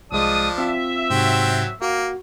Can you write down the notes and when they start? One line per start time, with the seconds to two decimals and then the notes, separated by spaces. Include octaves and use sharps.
0.12 C2 F3 G#3 D4 D#6
0.58 C4 F4 E5
1.10 G#2 C3 F#3 C4
1.82 A#3 F#4